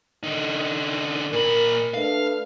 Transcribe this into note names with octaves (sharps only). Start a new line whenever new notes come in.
D3 D#4
A#2 A#4 B5
A3 D4 B4 F5